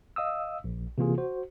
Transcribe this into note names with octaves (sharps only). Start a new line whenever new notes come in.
D#5 F5 D#6 E6
A#1
C3 E3 A#3 F4 G#4
F#4 C5